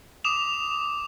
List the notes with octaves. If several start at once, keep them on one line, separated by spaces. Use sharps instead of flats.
D6 D#6 E7 F7